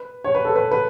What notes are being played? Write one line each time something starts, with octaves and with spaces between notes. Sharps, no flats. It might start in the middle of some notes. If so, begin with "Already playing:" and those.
Already playing: B4
C#5
B4
A4
B4
B4